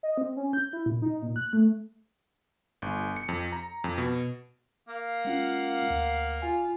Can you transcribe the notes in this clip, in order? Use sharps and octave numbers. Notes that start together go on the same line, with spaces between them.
D#5
C4
C#4
G6
E4
A#2
D#4
A#2
F#6
A3
G1
C#7
F2
A#5
F2
B2
A#3 F5
G#3 C#4 F4 F#5
D2
F4 G#5